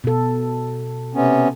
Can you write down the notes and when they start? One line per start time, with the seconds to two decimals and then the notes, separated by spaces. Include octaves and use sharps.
0.04 B2 A4
1.15 C3 B3 C#4